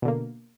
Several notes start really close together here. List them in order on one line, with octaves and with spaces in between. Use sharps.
B2 D3 A#3